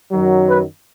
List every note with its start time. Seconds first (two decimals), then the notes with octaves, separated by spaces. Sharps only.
0.12 F#2 D#3 F#3
0.48 B4